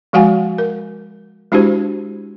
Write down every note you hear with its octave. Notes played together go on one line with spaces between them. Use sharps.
F3 G#3 F#4 F5 F#5 G#5
A#4
G#3 D4 E4 F#4 G4 C5